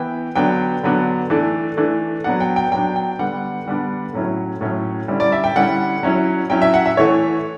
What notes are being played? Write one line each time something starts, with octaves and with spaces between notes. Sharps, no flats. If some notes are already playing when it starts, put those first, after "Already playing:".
Already playing: E3 B3 E4 G5
D3 F#3 B3 D4 G5
D3 F#3 B3 D4
E3 A3 D4
E3 A3 D4
F#3 B3 D4 F#5
G5
G5
F#3 B3 D4 G5
G5
D3 G3 B3 D4 F#5
D3 G3 B3 D4
A2 F#3 C#4 E4
A2 F#3 C#4 E4
D3 G3 C#4 E4
D5
E5
G5
D3 G3 C#4 E4 F#5
F#3 C#4 E4
F#3 C#4 E4 G5
E5
F#5
E5
E3 A3 E4 C#5